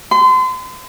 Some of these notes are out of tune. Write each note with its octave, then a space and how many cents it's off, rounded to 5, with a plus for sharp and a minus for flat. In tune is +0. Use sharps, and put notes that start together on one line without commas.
C6 -35